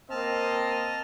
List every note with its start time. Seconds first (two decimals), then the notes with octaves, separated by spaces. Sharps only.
0.10 A#3 C4 D#5 A5 F6